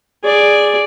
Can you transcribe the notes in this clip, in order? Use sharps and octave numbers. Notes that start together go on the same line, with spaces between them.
G#4 D5